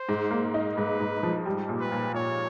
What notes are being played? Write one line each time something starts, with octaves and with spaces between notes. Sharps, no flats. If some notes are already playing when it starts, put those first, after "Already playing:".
Already playing: C5
G#2
A#3
D#4
G#2 B4
G#2
F3
G3
A#2
B4
A#2
A#2 C#5